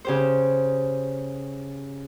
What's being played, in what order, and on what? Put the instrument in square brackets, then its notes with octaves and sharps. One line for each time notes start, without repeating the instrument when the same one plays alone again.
[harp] C#3 G4 C5